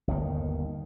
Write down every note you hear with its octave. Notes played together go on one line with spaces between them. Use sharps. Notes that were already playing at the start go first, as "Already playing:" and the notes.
G1 D#2 D#3